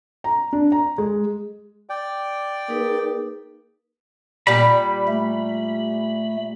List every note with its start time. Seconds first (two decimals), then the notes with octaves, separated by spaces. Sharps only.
0.24 A#5
0.53 D4
0.72 A#5
0.98 G#3
1.89 D5 G5
2.69 A#3 D#4 G#4 B4
4.47 A#2 G3 B5
5.08 A3